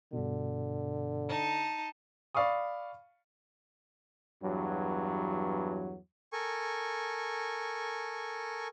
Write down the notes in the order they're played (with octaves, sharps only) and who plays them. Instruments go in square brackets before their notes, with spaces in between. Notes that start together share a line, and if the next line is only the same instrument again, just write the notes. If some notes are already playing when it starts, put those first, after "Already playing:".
[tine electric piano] G2 B2 [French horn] D3
[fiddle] D#4 A5
[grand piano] D5 F5 B5 C#6 D#6
[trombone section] E2 G2 F#3
[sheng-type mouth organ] A4 A#4 G#5 C#6